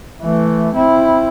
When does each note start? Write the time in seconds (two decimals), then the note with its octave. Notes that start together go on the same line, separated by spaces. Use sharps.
0.22 E3 A3
0.75 C4 E4